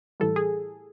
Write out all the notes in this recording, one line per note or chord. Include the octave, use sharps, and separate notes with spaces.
A2 E3 G3 A4
G#4